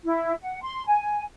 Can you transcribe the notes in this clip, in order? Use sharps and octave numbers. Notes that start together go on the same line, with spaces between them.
E4
F#5
C6
G#5